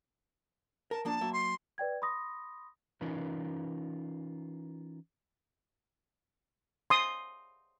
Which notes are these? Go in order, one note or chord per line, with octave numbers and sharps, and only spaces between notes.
A#4 A5
F3 A#3 D4 A5
F#3 A#3 E5
C6
B4 D5 G5 G#6
B5 C6 D#6 A#6
E3 C#4 D#4 F4 A#4 B4
C6 D#6